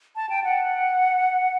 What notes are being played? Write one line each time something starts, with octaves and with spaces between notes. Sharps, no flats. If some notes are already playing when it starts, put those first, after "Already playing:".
A5
G5
F#5